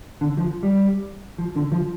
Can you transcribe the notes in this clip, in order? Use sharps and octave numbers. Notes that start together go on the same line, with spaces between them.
D3
F3
G3
F3
D3
F3